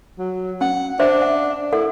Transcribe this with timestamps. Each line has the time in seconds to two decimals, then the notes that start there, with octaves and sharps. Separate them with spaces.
0.18 F#3
0.61 C#4 F#5
1.00 D4 C5 E5
1.22 F#5
1.73 E4 A4 F#5